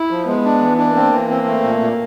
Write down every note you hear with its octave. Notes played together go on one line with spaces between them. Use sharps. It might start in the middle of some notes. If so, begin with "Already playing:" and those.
Already playing: E4
F3
G#3 B3
D4
E3
D4
A#3 C4
E3
C4
A3
A#2
A#2